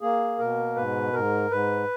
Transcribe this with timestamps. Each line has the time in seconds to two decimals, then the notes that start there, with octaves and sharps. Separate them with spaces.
0.01 A#3 G#4
0.39 B2 A#4
0.76 G#2 B4
1.13 G#2 A#4
1.51 G#2 B4